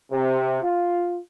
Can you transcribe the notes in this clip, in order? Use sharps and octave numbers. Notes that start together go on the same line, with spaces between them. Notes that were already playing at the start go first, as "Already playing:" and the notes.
C3
F4